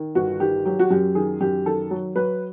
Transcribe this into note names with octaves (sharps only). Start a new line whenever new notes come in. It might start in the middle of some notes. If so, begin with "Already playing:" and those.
Already playing: D#3
G1 F#4
D#3 G4
F#3 G4
F#4
F#2 G4
D#3 G#4
F#2 G4
D#3 A4
F#3
F#3 B4